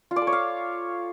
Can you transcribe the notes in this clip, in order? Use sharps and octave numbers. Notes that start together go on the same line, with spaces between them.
F4
D5
A4
C#5
F5